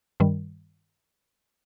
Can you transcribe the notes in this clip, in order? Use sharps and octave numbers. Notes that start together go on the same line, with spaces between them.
G2 D#3 G3